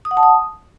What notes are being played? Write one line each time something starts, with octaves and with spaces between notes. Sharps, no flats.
D#6
F#5
A5
D#6